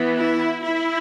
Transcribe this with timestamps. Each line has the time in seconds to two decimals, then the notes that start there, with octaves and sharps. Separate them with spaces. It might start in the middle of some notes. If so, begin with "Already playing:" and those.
Already playing: E3 B3
0.17 E4
0.64 E4